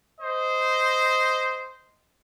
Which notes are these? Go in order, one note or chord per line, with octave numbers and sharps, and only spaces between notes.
C5 D#5